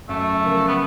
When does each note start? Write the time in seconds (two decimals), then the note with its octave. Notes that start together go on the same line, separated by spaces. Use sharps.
0.09 F#2 A3
0.41 C#3 F3 A#3
0.68 B3